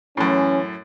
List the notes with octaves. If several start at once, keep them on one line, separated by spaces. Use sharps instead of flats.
F#2 A2 E3 C#4